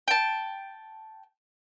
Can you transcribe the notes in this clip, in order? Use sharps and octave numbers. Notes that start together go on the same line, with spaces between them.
G5 A5